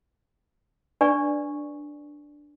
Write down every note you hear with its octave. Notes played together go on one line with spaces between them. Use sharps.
D4 B4 D5 G#5 C#6